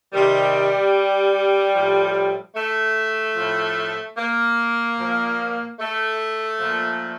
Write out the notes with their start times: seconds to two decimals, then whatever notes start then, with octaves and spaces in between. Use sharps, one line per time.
0.13 C3 D#3 G3
1.74 A2 F3
2.55 A3
3.36 A2 F3
4.18 A#3
4.98 A#2 F3
5.80 A3
6.60 A#2 F3